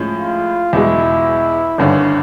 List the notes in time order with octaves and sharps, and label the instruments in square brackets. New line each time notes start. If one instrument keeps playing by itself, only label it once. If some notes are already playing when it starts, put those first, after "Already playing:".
Already playing: [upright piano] A2 F3 G#3 C#4
[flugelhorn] F4
[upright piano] E2 B2 G#3 [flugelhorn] E4
[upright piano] G#1 G2 D3 [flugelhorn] C#4